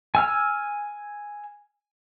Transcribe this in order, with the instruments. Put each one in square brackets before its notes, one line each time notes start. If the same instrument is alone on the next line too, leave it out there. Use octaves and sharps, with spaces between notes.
[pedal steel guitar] G#5 E6 F6